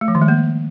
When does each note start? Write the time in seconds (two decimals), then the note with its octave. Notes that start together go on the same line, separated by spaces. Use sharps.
0.01 A3
0.08 F3
0.15 D#3
0.22 G#3
0.28 A#3